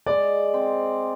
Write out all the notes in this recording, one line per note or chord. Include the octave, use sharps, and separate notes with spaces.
G#3 D5
C4